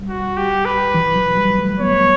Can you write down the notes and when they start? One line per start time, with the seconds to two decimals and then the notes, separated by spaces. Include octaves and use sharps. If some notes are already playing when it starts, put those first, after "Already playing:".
Already playing: G3
0.09 F#4
0.37 G4
0.65 B4
0.94 E3
1.16 F#3
1.37 G3
1.58 A3
1.79 B3 C#5